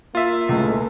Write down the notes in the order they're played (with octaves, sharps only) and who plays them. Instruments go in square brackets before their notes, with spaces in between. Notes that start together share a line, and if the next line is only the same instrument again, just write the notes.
[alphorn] A#3 [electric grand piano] F4 E5
[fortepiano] C#2 [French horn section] A2 G#3 A3